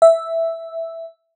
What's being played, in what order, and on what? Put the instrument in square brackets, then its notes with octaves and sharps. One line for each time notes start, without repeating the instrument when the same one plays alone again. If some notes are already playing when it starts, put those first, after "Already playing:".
[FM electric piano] E5